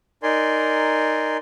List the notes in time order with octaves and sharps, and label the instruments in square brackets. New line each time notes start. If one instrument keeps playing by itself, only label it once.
[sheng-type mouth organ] D#4 A#4 D5 G#5 C6